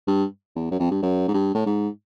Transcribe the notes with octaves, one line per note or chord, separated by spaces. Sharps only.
G2
E2
F#2
F2
G2
F#2
G#2
G2
A2
G#2